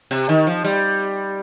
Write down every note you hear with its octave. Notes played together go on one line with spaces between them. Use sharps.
C3
D#3
F3
G3